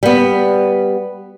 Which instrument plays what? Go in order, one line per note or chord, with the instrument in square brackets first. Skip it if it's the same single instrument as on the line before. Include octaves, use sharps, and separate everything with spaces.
[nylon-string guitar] G3 B3